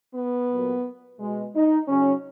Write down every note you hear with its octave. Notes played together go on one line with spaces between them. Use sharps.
B3
A#2 F#3
B2 G#3
D#4
C#3 F#3 C#4